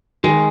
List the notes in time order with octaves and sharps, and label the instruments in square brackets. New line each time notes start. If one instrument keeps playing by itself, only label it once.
[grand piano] D#3 [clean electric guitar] G#3